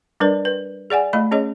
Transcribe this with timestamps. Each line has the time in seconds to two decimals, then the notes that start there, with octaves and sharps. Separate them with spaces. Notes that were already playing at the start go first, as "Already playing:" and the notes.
0.20 G3 D4 A#4 B4 D5
0.45 B4
0.90 G#4 D5 F#5 G#5
1.13 A3 D#5 B5
1.31 C#4 G#4 C#5 D#5